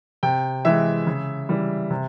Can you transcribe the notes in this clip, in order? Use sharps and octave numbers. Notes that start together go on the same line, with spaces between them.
C3 G5
E3 G#3 E5
C#3
E3 G3
C3